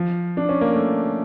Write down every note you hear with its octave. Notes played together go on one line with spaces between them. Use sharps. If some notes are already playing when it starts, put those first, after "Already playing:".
Already playing: F3
D4
C#4
A#3
A3